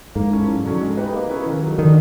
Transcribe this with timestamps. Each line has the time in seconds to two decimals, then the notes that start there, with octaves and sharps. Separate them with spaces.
0.15 G#2 A#3
0.31 C#4 E4 A4
0.48 F#2
0.64 D3 F#3 A3 C#4
0.81 G#3
0.97 B3 D#4 G4 B4
1.13 A#3
1.29 C#4 E4 G#4 B4
1.46 D#3
1.62 F#3 A3
1.78 D3 D#3